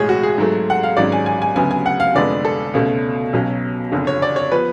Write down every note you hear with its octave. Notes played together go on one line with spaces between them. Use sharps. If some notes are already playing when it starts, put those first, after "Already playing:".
Already playing: B1 A2 G#3 G#4 C#5
F#4
G#4
G#2 F#3 A3
F#5
F5
G#1 G#2 F#3 C#4 D5
G#5
G#5
G#5
D2 C#3 F#3 B3 G#5
G#5
F#5
F5
F1 F2 D3 G#3 B3 D5
A4
C#2 B2 A3 C#4
B1 B2 F#3 C#4
F#1 F2 D3
C#5
D5
C#5
F3 B3 B4